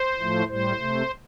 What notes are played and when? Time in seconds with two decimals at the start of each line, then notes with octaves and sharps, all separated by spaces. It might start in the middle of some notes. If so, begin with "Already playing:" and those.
Already playing: C5
0.18 A2 F3 A3
0.48 A2 G3 C5
0.79 C3 A3